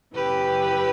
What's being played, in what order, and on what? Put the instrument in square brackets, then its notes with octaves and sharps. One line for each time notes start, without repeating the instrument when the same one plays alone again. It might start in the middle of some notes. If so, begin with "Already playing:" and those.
[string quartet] F#2 C#3 E3 G4 B4